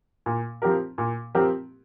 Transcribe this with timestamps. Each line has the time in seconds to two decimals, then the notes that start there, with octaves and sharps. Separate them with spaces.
0.26 A#2
0.62 F3 C4 G4 A#4
0.98 A#2
1.35 F3 C4 G4 A#4